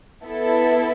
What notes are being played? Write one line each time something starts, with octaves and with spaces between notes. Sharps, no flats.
B3 E4 A4